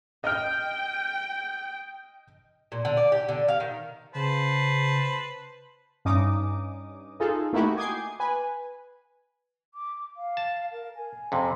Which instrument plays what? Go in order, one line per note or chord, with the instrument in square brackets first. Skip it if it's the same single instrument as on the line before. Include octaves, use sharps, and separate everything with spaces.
[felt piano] D#5 F6 [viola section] G5
[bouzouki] A#2
D3
D5
G4
D3
F5
D#3
[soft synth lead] C#3 [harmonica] B4 C5 A5
[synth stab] G2 C#4 D#4 D6 D#6
D#4 F4 G#4 A4
A3 A#3 D#4 E4 F#4 G4
G#5 D6 D#6 G6 G#6 C7
B4 G#5
[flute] D6
F5
[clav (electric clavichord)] A5
[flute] A#4
G#5
[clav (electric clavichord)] F2 C3